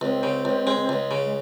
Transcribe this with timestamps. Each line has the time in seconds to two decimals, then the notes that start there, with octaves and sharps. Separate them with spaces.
0.01 C#2 C4
0.23 C#3
0.45 C#2
0.67 G#3
0.89 C#2
1.11 C#3
1.24 G#3